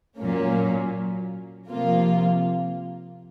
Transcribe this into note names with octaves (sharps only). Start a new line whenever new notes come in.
A#2 F#3 A#3 C#4
C3 F3 A#3 F4